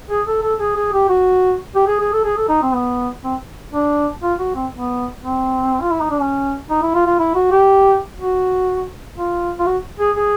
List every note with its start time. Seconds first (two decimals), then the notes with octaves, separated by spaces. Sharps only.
0.10 G#4
0.27 A4
0.43 A4
0.60 G#4
0.76 G#4
0.93 G4
1.09 F#4
1.75 G4
1.88 G#4
2.00 G#4
2.13 A4
2.25 G#4
2.37 A4
2.49 D#4
2.62 C4
2.74 B3
3.23 C4
3.73 D4
4.22 F4
4.39 F#4
4.55 C4
4.72 B3
5.22 C4
5.81 F4
5.91 E4
6.01 D#4
6.11 D4
6.21 C#4
6.70 D#4
6.82 E4
6.95 F4
7.06 F4
7.19 E4
7.35 F#4
7.52 G4
8.18 F#4
9.17 F4
9.59 F4
9.66 F#4
10.00 G#4
10.16 G#4